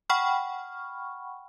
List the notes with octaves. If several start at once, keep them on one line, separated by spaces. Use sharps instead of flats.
F#5 G5 B5 C#6 F6